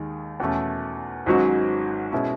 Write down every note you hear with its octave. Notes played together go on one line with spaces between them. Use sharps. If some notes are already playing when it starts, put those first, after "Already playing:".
Already playing: D#2 D#3 G#3 D#4
E2 B2 A3 C#4
G#1 G#2 F#3 C#4 F#4
B2 G#3 C#4 E4